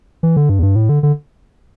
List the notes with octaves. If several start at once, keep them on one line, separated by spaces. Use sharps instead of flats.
E3
D3
G2
E2
G2
A2
D3
D3